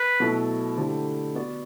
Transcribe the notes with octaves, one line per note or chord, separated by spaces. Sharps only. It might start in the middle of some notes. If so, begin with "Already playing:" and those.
Already playing: B4
B2 F#3 A3 E4
D3 A3 E4 G4 C5
B3 F#4 B4 D5